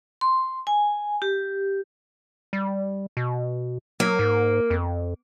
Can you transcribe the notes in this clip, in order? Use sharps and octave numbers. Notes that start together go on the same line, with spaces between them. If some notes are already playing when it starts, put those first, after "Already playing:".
C6
G#5
G4
G3
B2
F#3 A#3
G#2
F2